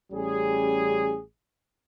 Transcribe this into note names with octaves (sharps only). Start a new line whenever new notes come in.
A1 G3 C#4 G#4